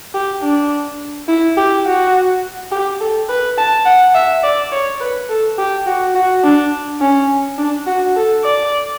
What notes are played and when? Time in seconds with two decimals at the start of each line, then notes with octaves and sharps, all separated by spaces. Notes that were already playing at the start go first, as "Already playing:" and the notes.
0.14 G4
0.42 D4
1.28 E4
1.57 G4
1.86 F#4
2.71 G4
3.00 A4
3.29 B4
3.58 A5
3.86 F#5
4.15 E5
4.43 D5
4.72 C#5
5.00 B4
5.29 A4
5.58 G4
5.87 F#4
6.15 F#4
6.43 D4
7.01 C#4
7.58 D4
7.86 F#4
8.16 A4
8.44 D5